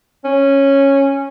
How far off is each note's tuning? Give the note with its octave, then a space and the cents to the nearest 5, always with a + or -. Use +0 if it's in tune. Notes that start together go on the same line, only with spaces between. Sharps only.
C#4 -10